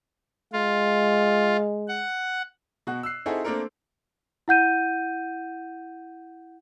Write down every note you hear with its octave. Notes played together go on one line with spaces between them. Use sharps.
G#3 F4
F#5
B2 F#4 F#6
E6 F#6 C7
C4 D#4 E4 F#4 G#4 A4
A3 A#3 C4 D4 A4 A#4
E4 F#5 G6 D#7